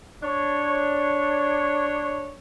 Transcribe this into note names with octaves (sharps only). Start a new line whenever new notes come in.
D4 C#5